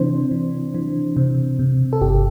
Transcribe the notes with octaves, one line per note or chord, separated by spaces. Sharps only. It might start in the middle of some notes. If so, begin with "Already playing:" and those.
Already playing: C3 E3 C4 D4 C5
E3
E3
C3
C3
A4
G1 G4